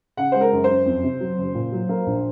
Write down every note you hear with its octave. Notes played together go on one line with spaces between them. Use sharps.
C#3 F#5
G#3 C5
A#4
F#2
C5
F#2
F2
C3
F#3
F#1
A#2
F#3
A#3
A#1